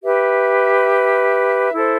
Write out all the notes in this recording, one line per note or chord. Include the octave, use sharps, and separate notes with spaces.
G4 B4 E5
E4 A4 C5